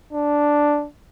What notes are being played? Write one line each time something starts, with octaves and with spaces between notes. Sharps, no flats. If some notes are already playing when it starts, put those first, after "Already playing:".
D4